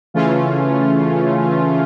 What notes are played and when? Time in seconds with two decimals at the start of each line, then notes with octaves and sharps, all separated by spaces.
0.14 C#3 E3 A3 C#4 F4